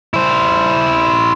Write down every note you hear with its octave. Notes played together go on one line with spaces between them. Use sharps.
E4 C5